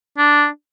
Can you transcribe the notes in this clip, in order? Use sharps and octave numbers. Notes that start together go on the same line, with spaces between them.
D4